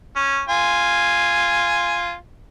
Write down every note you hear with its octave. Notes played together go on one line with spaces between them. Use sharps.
C#4
F4 G#5